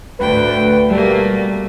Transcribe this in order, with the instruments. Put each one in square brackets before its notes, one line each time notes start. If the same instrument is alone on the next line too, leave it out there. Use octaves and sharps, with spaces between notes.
[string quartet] D2 A2 G5 [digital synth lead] B4
[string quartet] B2 A3 A#3 [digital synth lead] G3